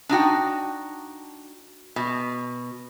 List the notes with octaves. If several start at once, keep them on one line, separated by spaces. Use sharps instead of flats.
D4 D#4 F#4 G5
B2